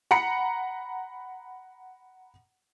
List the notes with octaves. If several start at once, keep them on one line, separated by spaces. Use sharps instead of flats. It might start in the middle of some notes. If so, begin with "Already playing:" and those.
F#5 A#5 B5 C#7